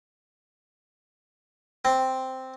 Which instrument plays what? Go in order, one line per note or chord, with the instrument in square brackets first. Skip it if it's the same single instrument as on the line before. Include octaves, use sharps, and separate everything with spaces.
[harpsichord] C4